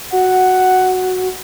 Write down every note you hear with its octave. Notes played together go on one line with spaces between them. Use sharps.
F#4 F#5